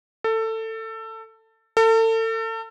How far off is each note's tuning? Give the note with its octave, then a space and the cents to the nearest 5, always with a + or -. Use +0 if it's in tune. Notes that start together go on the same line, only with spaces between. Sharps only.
A4 +20
A4 +35